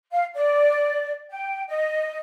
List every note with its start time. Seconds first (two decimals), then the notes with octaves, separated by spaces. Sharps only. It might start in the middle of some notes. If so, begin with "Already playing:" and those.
0.12 F5
0.34 D5
1.30 G5
1.69 D#5